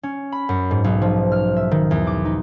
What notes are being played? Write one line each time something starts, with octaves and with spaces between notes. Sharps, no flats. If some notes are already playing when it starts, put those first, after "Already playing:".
C#4
B5
F#2
G#2
B1
F3
F6
E5
D#3
E2
D6
D#4